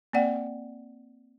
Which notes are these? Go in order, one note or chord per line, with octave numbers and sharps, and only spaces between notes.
A#3 C4 D5 F#5 G5